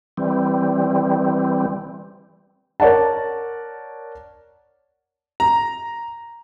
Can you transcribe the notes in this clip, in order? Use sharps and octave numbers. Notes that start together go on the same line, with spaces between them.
E3 G3 C4
A#4 C#5 D5 F#5 A5
A#5